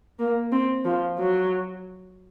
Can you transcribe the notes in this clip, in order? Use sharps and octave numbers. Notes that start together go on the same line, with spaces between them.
A#3
C4
F3
F#3